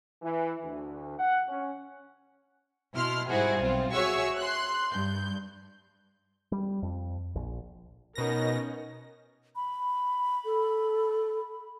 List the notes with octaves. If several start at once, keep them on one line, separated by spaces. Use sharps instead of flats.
E3
D2
F#5
C#4
B2 E4 C6 F6
G#2 G3 E4 F#4 G#4 C5
B1 C4 F4
F#4 G#4 C#5 E5 C#6 E6
C6 F#6
G2 G6
G3
F2
A#1
B2 C#4 D#4 A#4 A#6
B5
A4